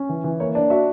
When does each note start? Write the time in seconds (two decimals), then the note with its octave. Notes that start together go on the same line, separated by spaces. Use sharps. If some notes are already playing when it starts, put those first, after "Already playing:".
Already playing: C#4
0.09 E3
0.24 E3
0.40 A#3 C#5
0.55 D4 D5
0.70 F#4 E5